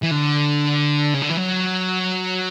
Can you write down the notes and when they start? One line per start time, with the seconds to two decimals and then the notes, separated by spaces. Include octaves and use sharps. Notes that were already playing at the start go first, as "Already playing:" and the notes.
0.03 E3
0.11 D3
1.14 C#3
1.22 D3
1.30 E3
1.37 F#3